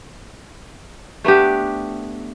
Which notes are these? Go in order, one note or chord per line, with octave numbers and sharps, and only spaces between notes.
A3 B3 D4 G4